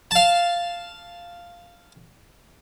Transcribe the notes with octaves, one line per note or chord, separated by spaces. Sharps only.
F5 A5